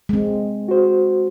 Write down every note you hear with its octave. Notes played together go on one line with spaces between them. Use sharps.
G#3 C4
F#4 C5